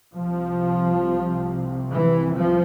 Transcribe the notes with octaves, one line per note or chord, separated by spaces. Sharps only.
C2 C3 F3
E3
F3